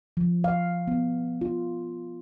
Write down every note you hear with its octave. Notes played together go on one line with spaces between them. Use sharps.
F3
F5
B3
F4